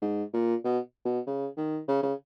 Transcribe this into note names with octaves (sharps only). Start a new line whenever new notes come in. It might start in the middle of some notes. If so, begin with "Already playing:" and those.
G#2
A#2
B2
B2
C#3
D#3
C#3
C#3